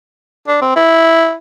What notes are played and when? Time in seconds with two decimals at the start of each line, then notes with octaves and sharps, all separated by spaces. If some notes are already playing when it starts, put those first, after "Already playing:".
0.48 D4
0.62 C4
0.76 E4